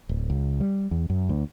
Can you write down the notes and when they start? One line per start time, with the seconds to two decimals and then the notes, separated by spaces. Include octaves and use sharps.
0.09 D1
0.30 C#2
0.60 G3
0.91 E2
1.10 F#2
1.29 D2